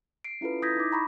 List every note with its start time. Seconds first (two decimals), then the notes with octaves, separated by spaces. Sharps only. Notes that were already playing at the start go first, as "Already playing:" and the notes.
0.24 C7 D7
0.41 C#4 E4 F4 A4 B4
0.62 E4 D#6 G6 G#6 A#6 B6
0.76 D#4 D6
0.92 A#5 B5 C#6